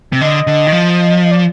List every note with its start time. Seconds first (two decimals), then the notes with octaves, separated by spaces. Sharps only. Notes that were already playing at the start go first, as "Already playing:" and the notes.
0.13 C3
0.20 D3 D#5
0.47 D3
0.67 D#3
0.72 F3
1.24 D#5
1.31 D5